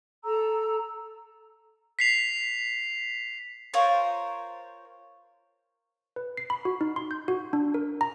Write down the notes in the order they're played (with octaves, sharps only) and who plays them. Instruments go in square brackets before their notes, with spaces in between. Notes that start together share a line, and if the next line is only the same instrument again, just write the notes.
[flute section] A4 A#5 E6
[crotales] B6 C7 F7
[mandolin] F4 A#4 C5 C#5
[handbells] B4
C7
B5
F#4
D#4
C6
G6
F#4
D4
A#4
A#5